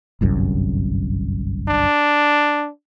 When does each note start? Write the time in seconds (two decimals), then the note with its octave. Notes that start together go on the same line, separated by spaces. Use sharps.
0.21 G1 C2 F#2
1.68 D4